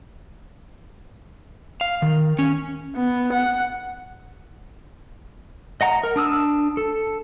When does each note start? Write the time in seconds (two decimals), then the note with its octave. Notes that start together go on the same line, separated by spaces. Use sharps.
1.81 F5
2.02 D#3
2.39 C#4
2.96 B3
3.33 F#5
5.81 D#5 F#5 A#5
6.03 A#4
6.16 D4 D#6 E6
6.77 A4